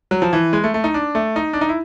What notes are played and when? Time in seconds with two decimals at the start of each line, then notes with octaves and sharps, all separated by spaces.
0.11 F#3
0.22 F3
0.33 E3
0.53 G#3
0.64 A3
0.74 A3
0.84 D#4
0.94 D4
1.15 A3
1.36 D#4
1.53 D4
1.61 D#4
1.69 E4